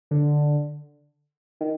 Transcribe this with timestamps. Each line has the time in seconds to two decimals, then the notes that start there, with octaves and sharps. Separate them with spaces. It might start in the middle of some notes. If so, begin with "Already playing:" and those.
0.11 D3
1.61 D#3